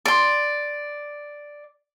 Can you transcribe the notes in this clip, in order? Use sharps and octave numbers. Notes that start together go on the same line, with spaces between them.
D5 C6